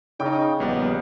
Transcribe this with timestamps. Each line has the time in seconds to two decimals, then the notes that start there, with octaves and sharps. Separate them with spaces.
0.20 C#3 D#4 G5
0.60 A#1 G3 B3 D5